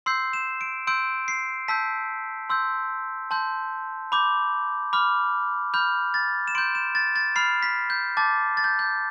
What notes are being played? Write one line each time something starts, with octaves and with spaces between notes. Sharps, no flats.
C6 E6 G6 C7
E7
D7
C6 E6 G6 D7
C7
A5 E6 G6 B6
C6 E6 G6
A5 C6 G6
B5 D6 G6
B5 D6 F6
B5 F6 G6
A6
E7
C6 G6 D7
E7
A6
A6
B5 F6 C7
B6
G6
A5 D6 G6 A6
A6
G6
G6